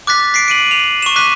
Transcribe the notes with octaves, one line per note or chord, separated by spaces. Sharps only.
D6 F#6 A6 B6
B6 C7 D7
D7 D#7 F#7
F7
C#6 E7
D6 F#6 B6 D#7